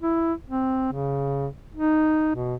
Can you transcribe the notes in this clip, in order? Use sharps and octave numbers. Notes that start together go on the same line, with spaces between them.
E4
C4
C#3
D#4
B2